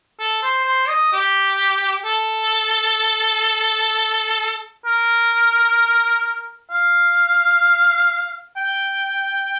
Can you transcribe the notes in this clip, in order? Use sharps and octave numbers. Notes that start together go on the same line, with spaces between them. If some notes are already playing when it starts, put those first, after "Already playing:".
A4
C5
C5
D#5
G4
A4
A#4
F5
G5